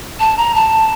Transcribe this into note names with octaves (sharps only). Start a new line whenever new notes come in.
A5
A#5
A5